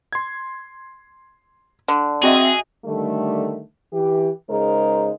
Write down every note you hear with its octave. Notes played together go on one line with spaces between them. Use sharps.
C6 G#6
D3
C4 F#4 G#4 D#5 E5
D3 D#3 G3 A3
E3 G4
C#3 G#3 D#4 A#4 C5